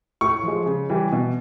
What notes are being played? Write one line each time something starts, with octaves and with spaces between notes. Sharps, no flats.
A2 C#6
F3 G#3
C#3
E3 G3
B2